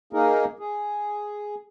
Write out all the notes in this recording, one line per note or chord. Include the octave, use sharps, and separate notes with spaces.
A#3 D#4 G#4 A#4
G#4